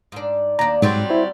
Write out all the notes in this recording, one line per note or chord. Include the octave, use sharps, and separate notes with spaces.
G#2 D4
D#2 D4 A#5
G#2 F#3 G3 C4
E4 C5